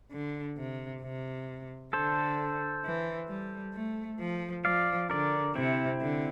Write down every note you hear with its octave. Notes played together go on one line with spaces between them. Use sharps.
D3
C3
C3
D3 A4 C5
E3
G3
A3
F3
F3 D5 F5
D3 A#4 D5
C3 C4 E4
D3